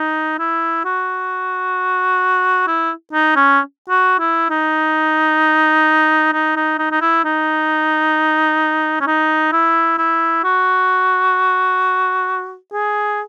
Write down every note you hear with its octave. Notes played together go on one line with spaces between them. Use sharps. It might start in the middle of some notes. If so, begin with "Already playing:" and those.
Already playing: D#4
E4
F#4
E4
D#4
C#4
F#4
E4
D#4
D#4
D#4
D#4
D#4
E4
D#4
C#4
D#4
E4
E4
F#4
G#4